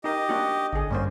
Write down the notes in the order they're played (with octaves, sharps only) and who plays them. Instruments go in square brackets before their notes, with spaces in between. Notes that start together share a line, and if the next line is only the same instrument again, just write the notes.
[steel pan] D#4 A#4 [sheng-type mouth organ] G4 D#5
[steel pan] A#3 D4 F#4
[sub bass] A1 [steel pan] D3 G#4
[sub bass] G2 [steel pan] G3 A#3 C5 [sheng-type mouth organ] C#4